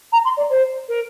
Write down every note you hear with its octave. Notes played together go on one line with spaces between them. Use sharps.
A#5
C6
D5
C5
A#4